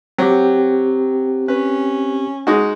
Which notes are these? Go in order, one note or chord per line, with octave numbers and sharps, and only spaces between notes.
F#3 C4 G4
C#4 B4
G#3 D#4 F#4